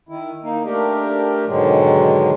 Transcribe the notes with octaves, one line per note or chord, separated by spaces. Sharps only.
D#3 E4
A#3 D#4
A3 D4 G4 A#4
G#2 B2 D3 D#3 F#3 G#3